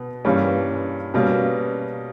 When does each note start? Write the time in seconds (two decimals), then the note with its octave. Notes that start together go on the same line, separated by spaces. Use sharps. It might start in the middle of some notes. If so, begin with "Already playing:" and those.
Already playing: B2 B3
0.25 G2 E3 G3 A#3 C#4
1.14 B2 G3 A#3 C#4